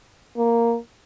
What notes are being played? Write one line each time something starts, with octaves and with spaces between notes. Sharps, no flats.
A#3